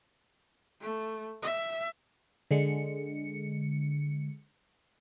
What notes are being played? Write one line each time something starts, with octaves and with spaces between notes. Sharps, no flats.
A3
E5
D3 G#3 C#7